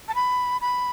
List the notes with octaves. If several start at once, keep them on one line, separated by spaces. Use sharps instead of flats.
A5
B5
B5